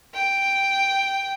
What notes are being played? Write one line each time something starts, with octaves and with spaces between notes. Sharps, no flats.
G5